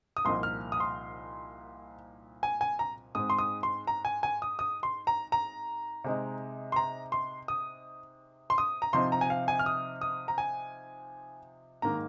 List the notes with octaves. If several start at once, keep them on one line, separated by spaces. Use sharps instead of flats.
D#6
C2 A#2 F3 A#3 D#4 C6
F6
D#6
C6
G#5
G#5
A#5
G#2 G#3 C4 D#6
C6
D#6
C6
A#5
G#5
G#5
D#6
D#6
C6
A#5
A#5
C3 G#3 D#4
C6
A#5
C6
D#6
C6
D#6
A#5
C3 F3 C4 D#4 C6
A#5
G#5
F5
G#5
F6
D#6
D#6
A#5
G#5
G#2 D#3 A#3 A#5